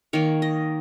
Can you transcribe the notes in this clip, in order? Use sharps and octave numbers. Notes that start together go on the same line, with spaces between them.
D#3 A#3 C#5
D#5